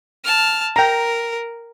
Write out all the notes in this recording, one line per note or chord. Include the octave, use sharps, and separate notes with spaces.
A5 F6
A#4 G5 A#5